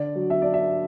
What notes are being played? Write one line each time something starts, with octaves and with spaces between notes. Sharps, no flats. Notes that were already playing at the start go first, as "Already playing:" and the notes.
Already playing: D3 D5
F#3
E5
D4 D5
E5